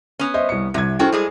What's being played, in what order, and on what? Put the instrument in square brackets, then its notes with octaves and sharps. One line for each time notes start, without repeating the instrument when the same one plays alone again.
[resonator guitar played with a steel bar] B3 C#4
[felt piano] C5 D#5 E5
C2 C#7
[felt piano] C2 G#6 [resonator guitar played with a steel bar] C3
[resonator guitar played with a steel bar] C#4 F#4 G5 [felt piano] E4 A4 C5
[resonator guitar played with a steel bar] G3 G#3 G#4